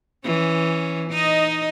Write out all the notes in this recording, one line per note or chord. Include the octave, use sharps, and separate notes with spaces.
E3 C#4
D#4 D#5